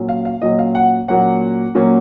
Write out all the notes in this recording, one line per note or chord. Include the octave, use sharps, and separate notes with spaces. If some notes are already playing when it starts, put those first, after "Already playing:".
Already playing: A#2 F#3 C#4
F5
F5
A#2 F#3 C#4 D#5
F5
F#5
A#2 F#3 A#3 C#4 F#5
A#2 F#3 A#3 C#4